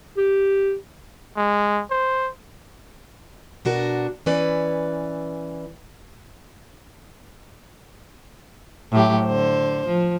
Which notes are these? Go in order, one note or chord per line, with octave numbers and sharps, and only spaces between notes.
G4
G#3
C5
B2 D4 F#4 A#4
E3 C#4 B4 D5
A2 F#3 G4
D3 C5
F3